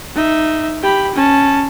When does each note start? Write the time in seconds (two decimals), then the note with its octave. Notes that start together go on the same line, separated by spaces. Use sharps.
0.15 D#4 E5
0.82 G4 B5
1.15 C#4 A5